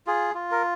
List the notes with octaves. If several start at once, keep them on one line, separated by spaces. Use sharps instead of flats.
F4 G#4
F4
A#4